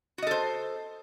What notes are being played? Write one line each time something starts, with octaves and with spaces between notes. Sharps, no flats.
F#4 A4 C5 D#5